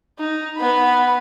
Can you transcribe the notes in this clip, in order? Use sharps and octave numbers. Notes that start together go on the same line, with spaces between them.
D#4
B3 B5